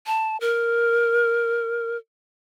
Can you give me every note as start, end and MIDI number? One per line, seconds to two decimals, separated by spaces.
0.07 0.37 81
0.41 1.97 70